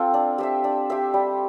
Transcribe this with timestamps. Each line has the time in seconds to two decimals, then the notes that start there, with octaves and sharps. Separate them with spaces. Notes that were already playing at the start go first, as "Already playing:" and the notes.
Already playing: C4 F4 A4
0.14 D4
0.38 G4 C5 E5
0.64 D4
0.90 G4 C5 E5
1.14 G3